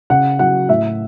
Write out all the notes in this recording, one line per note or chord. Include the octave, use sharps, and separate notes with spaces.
C#3 F#5
F#3 F#5
A2 E5